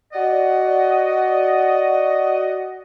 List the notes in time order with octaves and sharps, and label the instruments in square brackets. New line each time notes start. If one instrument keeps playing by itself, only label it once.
[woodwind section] F#4 D5 D#5 F#5